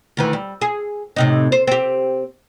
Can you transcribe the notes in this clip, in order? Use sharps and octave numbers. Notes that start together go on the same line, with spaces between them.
D2 D#3 E3
G3
G#4
A2 C3 D#4
C5
C4 G4